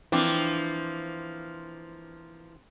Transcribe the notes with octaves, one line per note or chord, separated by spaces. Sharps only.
E3 F3 A#3 C4 D4